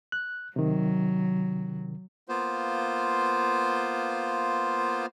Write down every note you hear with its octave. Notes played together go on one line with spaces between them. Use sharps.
F#6
C3 D#3 F#3
A#3 B3 F4 C5